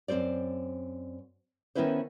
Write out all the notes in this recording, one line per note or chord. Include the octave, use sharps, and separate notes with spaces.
F#2 C4 A4 C5 D5
D#3 B3 C#4 E4 B4 C5